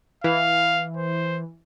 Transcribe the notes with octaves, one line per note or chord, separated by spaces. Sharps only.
E3 F5
C5